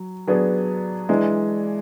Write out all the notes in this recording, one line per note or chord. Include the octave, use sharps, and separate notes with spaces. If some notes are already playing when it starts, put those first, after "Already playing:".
Already playing: F#3
F#3 B3 D4 G#4
E3 G#3 D4